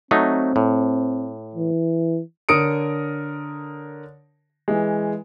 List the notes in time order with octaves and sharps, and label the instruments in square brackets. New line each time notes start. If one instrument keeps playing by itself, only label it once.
[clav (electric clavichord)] F#3 A3 D#4 [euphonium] C4
[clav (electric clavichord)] A2
[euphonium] E3
[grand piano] D3 A#4 C#5 D#6 C#7 D7
E3 G#3